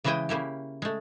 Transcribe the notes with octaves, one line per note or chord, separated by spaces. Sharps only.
C#3 E3 G#3 E4 D#5 G5
C#3 A#3 E4 G4
G#3 A3